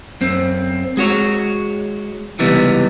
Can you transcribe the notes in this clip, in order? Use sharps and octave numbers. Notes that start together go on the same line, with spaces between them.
F#2 C4
G#3 F#4 C#5
C#2 C3 E3 G3 B3 D#4